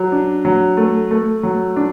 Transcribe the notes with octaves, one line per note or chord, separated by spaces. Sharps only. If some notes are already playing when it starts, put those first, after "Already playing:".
Already playing: F#3
D4
F#3
A3
A3
F#3
D4